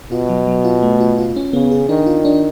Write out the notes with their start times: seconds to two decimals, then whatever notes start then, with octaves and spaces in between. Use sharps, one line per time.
0.11 B2 F4
0.29 F#3
0.47 F#3
0.65 F4
0.82 A3
1.00 F4
1.18 F4
1.36 C#4
1.53 C#3 B3
1.71 G#4
1.89 D#3 D4
2.07 F4
2.25 D4